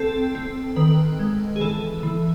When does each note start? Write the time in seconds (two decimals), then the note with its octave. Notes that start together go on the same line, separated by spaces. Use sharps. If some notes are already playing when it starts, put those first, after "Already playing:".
Already playing: C4 A4
0.35 C4
0.76 D#3 B4
1.19 G#3
1.56 G#4
1.61 E3 A4
2.03 E3